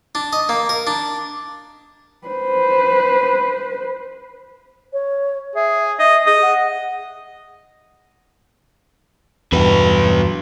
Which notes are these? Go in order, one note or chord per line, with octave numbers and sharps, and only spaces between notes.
D4
D#5
A#3
A#4
D4
B4 C5
C#5
G#4 E5
D#5 E5
G#4 D#5
F#5
E2 G2 F#3 B4